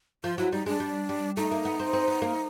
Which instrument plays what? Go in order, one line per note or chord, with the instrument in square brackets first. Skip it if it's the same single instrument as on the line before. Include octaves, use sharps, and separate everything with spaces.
[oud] F3 [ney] F4
[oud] F#3 [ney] E4
[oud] G3 [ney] D#4
[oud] G#3 [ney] D4
[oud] G3
G3
[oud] A3 [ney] D#4
[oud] A#3
B3
C4
C4
B3
A#3